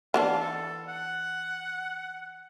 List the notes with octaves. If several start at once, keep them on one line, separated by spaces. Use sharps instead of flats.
E3 B3 D4 F5
A4
F#5